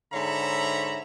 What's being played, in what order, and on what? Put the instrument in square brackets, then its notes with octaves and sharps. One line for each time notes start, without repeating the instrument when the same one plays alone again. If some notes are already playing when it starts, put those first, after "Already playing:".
[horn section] G#2 D3 C#5 E5 A#5 B5